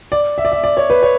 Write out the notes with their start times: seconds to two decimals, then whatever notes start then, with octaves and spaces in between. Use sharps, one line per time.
0.12 D5
0.38 E5
0.45 D5
0.52 E5
0.64 D5
0.77 C#5
0.90 B4
1.03 C#5